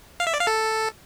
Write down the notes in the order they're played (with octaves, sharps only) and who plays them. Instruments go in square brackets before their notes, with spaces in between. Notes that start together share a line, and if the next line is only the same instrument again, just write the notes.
[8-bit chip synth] F5
E5
D5
F5
A4